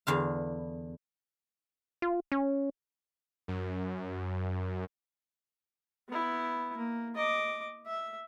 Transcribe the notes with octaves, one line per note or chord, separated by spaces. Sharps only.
E2 D3 F5
F4
C#4
F#2
B3 E4
A#3
D#5 D6
E5